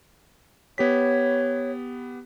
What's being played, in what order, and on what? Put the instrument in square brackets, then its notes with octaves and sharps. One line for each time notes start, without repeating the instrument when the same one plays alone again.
[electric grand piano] B3 G4 B6 [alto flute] C#5